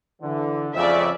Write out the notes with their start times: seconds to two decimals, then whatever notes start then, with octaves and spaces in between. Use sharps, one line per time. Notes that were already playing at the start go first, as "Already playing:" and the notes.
0.22 D3 E3
0.75 F2 C#3 D5 E5